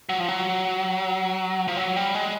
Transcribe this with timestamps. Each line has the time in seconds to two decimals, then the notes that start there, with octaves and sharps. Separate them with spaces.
0.09 F#3
0.20 F3
0.28 F#3
1.68 F3
1.77 F#3
1.96 G3
2.15 G#3